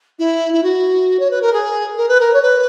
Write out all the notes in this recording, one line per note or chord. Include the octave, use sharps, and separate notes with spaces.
E4
E4
F#4
C#5
B4
A#4
G#4
A#4
B4
A#4
C#5
B4